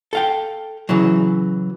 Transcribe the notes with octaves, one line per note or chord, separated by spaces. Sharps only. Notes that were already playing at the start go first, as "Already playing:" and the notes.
A4 F5 G5
C#3 E3 F#3